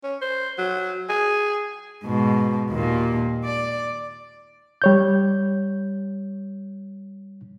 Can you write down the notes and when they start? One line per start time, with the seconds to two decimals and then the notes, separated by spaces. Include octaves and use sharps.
0.04 C#4
0.21 C5
0.58 F#3
1.09 G#4
2.04 G#2 B2
2.71 D#2 A#2
3.44 D5
4.82 G3 C#5 G6